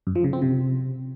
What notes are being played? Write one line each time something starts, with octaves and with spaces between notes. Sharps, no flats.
F#2
F3
C#3
C4
C3